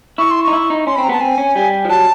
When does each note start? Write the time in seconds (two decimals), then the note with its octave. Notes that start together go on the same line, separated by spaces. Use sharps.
0.18 E4 C#6
0.31 C6
0.43 D#4 C#6
0.53 E4
0.70 D#4
0.87 C#4 C6
0.96 B5
0.98 C4
1.04 A#5
1.09 B3 A5
1.20 C4 G#5
1.38 C#4
1.56 G3
1.85 F3
1.89 F#3 A5